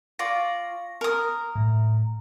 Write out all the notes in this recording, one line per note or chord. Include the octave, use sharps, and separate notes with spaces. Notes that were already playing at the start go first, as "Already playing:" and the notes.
F4 D5 C#6 A#6
A#4 D#6
A2